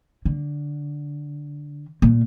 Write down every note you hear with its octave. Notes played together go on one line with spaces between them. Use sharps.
D3
A#2